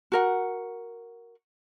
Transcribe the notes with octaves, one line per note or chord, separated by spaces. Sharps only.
F#4 A#4 F#5